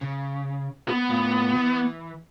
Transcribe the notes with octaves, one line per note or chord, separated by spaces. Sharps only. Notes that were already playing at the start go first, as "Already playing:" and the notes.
C#3
B3
A2 F4
E3